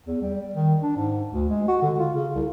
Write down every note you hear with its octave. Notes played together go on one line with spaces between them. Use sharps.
E2
G3
D#3
D4
G#2
D2
G#3
F#4
D3
F4
C#3
C2